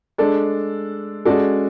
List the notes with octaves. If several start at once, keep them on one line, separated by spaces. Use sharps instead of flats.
G#3 D4 A4 D5
G#3 C#4 F#4 A4 D5